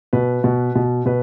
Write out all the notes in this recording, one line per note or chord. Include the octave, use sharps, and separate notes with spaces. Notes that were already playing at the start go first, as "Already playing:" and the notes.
B2 B4
B2
B2
B2 B4